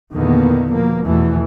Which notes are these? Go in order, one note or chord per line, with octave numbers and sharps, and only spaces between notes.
E2 A#2 D3 D#3 A#3 B3
B2 F3 A#3
E2 B2 E3 F3 A3